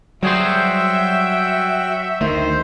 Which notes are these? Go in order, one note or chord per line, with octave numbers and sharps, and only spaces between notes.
F#3 G3 F#4 G#4 C5 E5 G5
D2 D#3 A3 C5